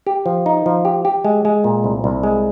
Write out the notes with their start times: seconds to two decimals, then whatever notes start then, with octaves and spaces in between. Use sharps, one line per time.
0.07 G4
0.26 F3
0.46 D#4
0.66 F3
0.85 G4
1.05 G4
1.24 G#3
1.45 G#3
1.64 A#2
1.84 C2
2.04 C2
2.23 G#3